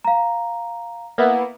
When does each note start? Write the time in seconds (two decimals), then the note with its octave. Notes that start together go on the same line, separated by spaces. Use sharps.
0.05 F5 A#5
1.18 A#3 B3 E4